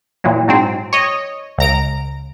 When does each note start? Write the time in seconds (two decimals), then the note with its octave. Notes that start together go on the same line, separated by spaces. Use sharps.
0.24 A#2 E3 F#3
0.48 G#2 F#3 C4
0.93 C#5 D#5
1.58 C#2 A#5 D7